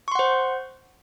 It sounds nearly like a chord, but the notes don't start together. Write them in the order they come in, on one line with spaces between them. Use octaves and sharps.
C#6 C6 F#5 C5